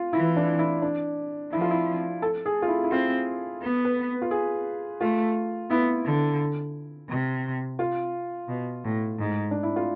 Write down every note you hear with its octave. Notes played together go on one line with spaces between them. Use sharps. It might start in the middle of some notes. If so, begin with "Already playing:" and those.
Already playing: F4
E3 E4
D4
E4
D4
F3 E4
F4
E4
A4
G#4
F4
E4
E4
C4 F4
B3
B4
F4
G#4
A3 F4
B3 E4
D3
C3
F4
B2
A2
G#2
D4
E4
F4